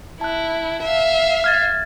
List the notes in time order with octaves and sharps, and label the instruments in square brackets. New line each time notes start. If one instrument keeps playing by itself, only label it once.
[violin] E4 [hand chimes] A5 F#6
[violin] E5 F5
[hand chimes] F6 G#6 A6